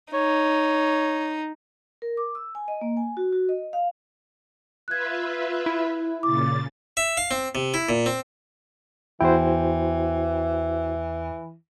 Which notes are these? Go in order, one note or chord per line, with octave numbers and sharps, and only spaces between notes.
D#4 C#5
A#4
D6
E6
G#5
D#5
A#3
G#5
F#4
F#4
D#5
F5
F4 B4 E5 F#6 G#6
E4
A#2 C#3 D6 A6
E5
F5
C4
C3
E4
A#2
C4
E2 E3 E4 F#4 C5 G5